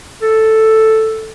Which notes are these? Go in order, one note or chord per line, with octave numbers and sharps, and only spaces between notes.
A4